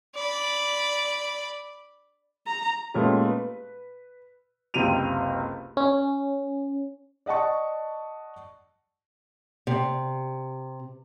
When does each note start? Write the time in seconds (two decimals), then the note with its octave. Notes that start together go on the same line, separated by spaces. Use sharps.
0.15 D5 B5
2.47 A#5
2.94 A#2 G#3 A3 B3 C#4 G4
3.26 B4
4.74 F#1 C#2 C3 G4 D#7 F7
5.77 C#4
7.26 D5 D#5 F#5 A5 C#6
9.67 C3